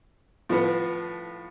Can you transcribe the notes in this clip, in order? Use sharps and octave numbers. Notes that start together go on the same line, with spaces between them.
A2 F3 B3